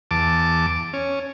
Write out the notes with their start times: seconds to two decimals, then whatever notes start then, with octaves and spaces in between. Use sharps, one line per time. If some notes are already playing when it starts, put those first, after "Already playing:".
0.11 E2 A5 D6
0.94 C#4